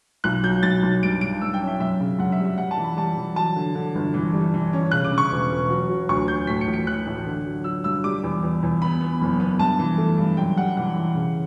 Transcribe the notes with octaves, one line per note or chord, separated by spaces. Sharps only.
B1 F#6
F#3 G6
B1 A6
B1
G2 D7
G2 D7
G2 E6
G5
C#4
E5
F#2 E5
C#3
F#2 F#5
E5
G3
E5
G3 F#5
A5
E3
B5
G3 A5
E3
F#3 A5
D3
D3
G1
E3
G3
E3
C#4
C#3 F#6
D6
C#3
C#6
E1
E1
F#3
F#3
D2 C#6
F#3 G6
A2 B6
C#7
A1
C#7
A1 F#6
A1
D3
F#3
F#3 E6
G2 E6
G3 D6
E2
E2
E2
B3 B5
B3
F#1
B3
G2 A5
E3
A3
G2
F#2 G5
G3 F#5
E3 F#5
E3
C#3